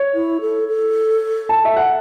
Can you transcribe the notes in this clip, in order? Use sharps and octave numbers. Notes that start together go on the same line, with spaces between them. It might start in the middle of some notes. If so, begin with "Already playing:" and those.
Already playing: C#5
E4
A4
A4
A5
E5
F#5